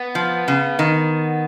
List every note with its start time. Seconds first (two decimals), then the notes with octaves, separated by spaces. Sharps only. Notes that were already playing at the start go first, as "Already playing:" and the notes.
Already playing: B3
0.15 F3
0.48 C#3
0.79 D#3